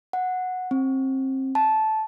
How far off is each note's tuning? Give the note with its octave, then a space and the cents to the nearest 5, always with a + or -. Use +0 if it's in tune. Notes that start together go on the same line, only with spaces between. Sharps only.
F#5 -10
C4 +25
A5 -10